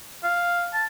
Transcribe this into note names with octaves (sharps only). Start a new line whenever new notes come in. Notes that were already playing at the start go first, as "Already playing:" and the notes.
F5
A5